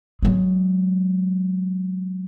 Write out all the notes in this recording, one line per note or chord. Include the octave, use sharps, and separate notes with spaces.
F#3 G#3